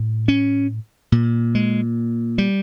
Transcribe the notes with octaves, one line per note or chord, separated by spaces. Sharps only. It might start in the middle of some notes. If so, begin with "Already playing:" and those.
Already playing: A2
C#4
A#2
G#3
G3